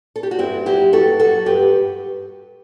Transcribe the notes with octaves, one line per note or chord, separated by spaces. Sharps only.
A4
G4
F#4
G2 C4 E4
F#3 E4 G4
G2 F#4 A4
F#3 F#4 A4
G2 G4 B4